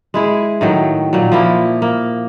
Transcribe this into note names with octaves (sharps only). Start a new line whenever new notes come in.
G#3 E4 G#4
A2 D#3 F#3
A#2 F#3
F3 A#3 E4
A#3